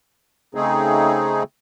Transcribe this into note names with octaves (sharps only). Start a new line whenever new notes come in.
C#3 A3 C4 D#4 G#4